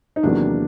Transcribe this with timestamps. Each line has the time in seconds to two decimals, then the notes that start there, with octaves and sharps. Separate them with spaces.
0.16 D#4
0.23 E2 C3 D#3 F#3 A#3 D4